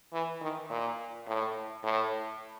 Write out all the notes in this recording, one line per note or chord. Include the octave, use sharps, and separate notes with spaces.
E3
D#3
A#2
A2
A2